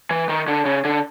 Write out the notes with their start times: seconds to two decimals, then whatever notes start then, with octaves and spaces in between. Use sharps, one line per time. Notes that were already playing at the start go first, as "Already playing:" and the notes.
0.11 E3
0.29 D#3
0.48 D3
0.65 C#3
0.85 D3